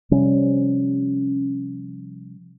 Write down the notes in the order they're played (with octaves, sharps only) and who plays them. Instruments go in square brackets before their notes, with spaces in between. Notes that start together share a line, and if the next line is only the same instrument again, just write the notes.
[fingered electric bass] C3 F3 G3 C#4